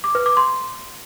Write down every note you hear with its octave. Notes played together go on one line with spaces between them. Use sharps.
D6
B4
D6
C6